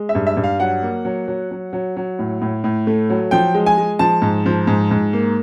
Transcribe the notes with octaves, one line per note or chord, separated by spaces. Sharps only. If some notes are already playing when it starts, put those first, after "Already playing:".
Already playing: G#3
E5
G2
E5
G2
F5
F#3 F#5
A#3
F#3
F#3
F#3
F#3
F#3
A2
A2
A2
A3
F#3
F3 G5
G#3
G#5
G#3
F3 A5
G#2
F3
G#2
G#2
A#3